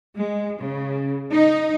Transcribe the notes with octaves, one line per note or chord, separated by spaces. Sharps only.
G#3
C#3
D#4